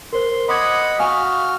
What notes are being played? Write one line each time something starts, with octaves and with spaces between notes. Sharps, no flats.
A#4 C5 C6
D#5 F#5 B5 C6 D6 G#6
F#4 F5 G#5 D#6 F6